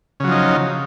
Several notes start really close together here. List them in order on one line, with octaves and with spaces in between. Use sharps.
C#3 F#3 F3 D#4